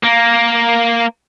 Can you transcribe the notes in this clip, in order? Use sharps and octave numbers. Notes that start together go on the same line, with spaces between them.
A#3